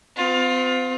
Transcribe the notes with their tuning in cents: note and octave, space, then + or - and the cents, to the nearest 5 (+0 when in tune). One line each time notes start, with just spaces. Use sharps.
C4 -35 F4 +20